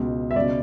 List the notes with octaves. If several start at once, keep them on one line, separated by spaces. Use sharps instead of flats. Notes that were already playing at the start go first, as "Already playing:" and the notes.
Already playing: C#2 B2
E5
C#2 B2 D5